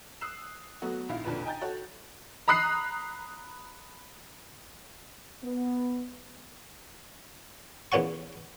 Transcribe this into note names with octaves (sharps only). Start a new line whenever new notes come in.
D#6 E6 F#6 C7 E7
F#3 A3 B3 F#4
A#1 G#2 E4 F5
B1 F2 A#2 D3 B4 E7
D#5 G5 G#5 A#5 G6 A6
F#4 A4 C#5 F#5
A#5 B5 D#6 F#6 C7
B3
E2 A#2 C#4 F#5 C#6